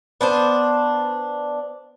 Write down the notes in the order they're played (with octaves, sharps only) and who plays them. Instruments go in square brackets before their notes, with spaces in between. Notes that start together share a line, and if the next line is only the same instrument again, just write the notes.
[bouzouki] B3 D4 C5